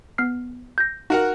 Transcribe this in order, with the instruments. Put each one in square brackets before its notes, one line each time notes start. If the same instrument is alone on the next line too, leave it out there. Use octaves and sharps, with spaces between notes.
[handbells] B3 F6 C7
G6 A#6
[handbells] D#4 [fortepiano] F#4 A#4 F#5